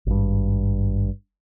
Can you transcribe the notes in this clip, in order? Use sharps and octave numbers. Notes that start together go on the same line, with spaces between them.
G#1 G2